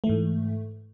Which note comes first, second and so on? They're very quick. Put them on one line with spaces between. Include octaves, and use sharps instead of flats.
A3 E3 G#2